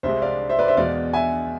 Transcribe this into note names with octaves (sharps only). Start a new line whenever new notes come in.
C2 C3 G#3 C5 E5
D5 F5
C5 E5
B4 D5
C5 E5
E2 B2 G#3 D5 F5
E5 G#5